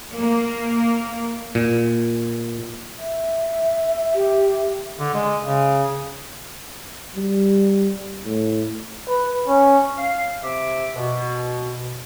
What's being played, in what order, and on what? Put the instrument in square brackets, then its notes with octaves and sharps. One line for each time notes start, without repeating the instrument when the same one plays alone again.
[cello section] A#3
[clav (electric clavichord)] A#2
[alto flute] E5
[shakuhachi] G4
[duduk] D3
G#3
C#3
[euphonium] G3
A2
[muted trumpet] B4
C#4
[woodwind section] F5
C3 E5 D6
B2